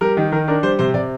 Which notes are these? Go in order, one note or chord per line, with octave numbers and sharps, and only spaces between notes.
G3 A#4
D#3
D#3 A#4
D4 A#4
G3 C5
C3 C5
C3 D5